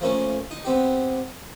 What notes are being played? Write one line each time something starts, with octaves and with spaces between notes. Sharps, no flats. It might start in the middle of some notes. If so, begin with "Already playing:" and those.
F3 A3 A#3 C#4
D#4
B3 C4 G4